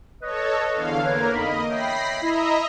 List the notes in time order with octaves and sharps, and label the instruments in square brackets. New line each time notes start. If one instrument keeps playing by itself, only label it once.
[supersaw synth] A4 C#5 [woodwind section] B4 D#5
[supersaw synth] E2 D3 F5
[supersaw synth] A#3 A#4 [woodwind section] B4 C#5
[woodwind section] F2 D#4 B5 [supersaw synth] D#5
[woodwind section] C#5 E5 G5 [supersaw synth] B5 A#6 C7
[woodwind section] E4 [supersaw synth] D#5 E5 A#5